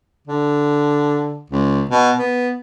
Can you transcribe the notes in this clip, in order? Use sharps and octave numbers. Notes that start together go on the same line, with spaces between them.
D3
C#2
B2
B3